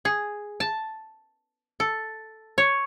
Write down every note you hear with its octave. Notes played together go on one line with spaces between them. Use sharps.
G#4
A5
A4
C#5